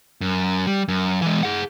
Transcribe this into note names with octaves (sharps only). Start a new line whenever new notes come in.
F#2
G3
F#2
E3 G#3
G#4 F#5